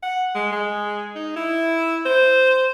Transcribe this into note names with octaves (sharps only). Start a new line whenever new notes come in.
F#5
G#3
G#3
D#4
E4
C5